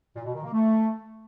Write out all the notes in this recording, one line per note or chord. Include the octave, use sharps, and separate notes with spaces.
A#2
B2
D#3
A#3
A3